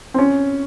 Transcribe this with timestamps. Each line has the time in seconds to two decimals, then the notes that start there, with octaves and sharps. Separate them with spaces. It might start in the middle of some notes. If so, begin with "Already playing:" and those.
0.14 C4
0.18 C#4